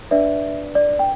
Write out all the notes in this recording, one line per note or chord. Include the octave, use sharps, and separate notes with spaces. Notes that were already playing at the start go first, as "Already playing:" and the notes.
D4 B4 D5 E5
D5
G5